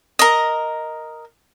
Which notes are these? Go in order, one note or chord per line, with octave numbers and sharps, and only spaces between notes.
A#4 D#5